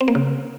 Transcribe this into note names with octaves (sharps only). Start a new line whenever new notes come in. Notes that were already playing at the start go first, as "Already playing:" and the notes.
C4
A#3
C#3